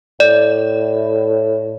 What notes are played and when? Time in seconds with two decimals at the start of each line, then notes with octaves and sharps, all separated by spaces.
0.20 A2 D5